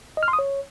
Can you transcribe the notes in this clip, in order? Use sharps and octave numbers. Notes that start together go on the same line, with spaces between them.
D#5
F6
C6
D#6
C#5